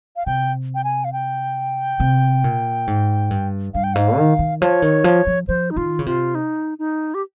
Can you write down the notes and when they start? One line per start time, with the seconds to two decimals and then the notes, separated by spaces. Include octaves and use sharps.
0.16 F5
0.26 C3 G5
0.75 G5
0.84 G#5
1.05 F5
1.13 G5
2.00 C3
2.44 A#2
2.87 G#2
3.31 G2
3.74 G2 F5
3.84 G5
3.94 G#2 F5
4.17 D#3
4.39 D#3
4.61 F3 C#5
4.82 D#3
5.04 F3
5.27 F3
5.48 F3 C5
5.71 D#4
5.76 D#3 F4
5.99 C#3
6.06 C3 F4
6.35 D#4
6.79 D#4
7.14 G4